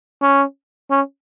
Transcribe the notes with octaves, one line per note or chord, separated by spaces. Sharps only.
C#4
C#4